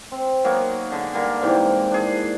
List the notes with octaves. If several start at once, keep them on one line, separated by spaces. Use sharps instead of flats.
C4
F#3 A#3 B3 D#4
D3 G#4 A5
D3 G3 A#3 A#4
G#2 C3 E3 G4
D4 G#4